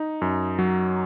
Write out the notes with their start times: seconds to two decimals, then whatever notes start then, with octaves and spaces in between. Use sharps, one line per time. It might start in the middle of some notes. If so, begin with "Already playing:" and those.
Already playing: D#4
0.22 F#2
0.59 F#3